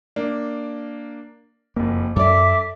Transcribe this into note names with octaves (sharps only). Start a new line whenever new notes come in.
A#3 D4
F#1 F2 A#3
F#2 A4 D5 E5 D6